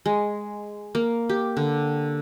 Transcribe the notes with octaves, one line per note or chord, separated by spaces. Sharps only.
G#3
A#3
G4
D3